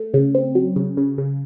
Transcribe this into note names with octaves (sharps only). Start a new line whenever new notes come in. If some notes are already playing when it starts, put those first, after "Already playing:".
Already playing: A3
C#3
C4
F#3
C#3
C#3
C#3